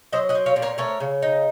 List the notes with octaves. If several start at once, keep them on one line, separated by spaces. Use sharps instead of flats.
F#3 C5 D#5
D#5 F#5
C4
C#5 F5
A#2
A#4 C#5
A3 A#4 C#5
C#3
D#4